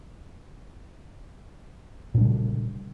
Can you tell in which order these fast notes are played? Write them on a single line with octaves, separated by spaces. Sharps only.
A#2 D4 G3 C#3